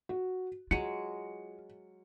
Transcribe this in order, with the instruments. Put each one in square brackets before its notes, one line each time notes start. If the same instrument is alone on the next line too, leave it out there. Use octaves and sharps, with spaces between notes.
[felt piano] F#4
[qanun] F#3 G#3 [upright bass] F4 [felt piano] C#7